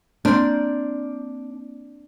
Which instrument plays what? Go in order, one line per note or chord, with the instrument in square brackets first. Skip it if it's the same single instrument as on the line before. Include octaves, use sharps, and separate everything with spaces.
[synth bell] A#3 C4 [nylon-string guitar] D4